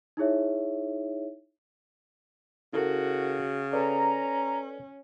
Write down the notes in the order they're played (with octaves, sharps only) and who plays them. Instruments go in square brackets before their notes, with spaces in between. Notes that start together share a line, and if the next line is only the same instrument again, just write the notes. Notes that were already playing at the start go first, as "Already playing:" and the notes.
[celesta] D#4 E4 G#4 C#5 E5
[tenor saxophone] C#3 [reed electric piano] E4 A4 A#4 [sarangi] F#4
[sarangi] C#4 [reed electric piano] A4 B4 D5 [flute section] A#5